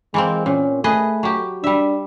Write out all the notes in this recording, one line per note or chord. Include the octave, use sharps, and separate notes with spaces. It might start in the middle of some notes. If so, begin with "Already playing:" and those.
E3 G#3 A#3 C4
A#2 C#4
A3 G#4 B4 D#5
F#3 G4
G3 D4 E5